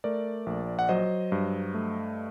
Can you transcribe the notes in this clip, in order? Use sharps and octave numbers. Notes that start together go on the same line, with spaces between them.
A3 A#4 D5
A#1
F#5
F#3 C5 D#5
G2
A3